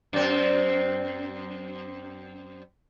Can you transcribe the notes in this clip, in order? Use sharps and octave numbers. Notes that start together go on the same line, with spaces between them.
F#2 C4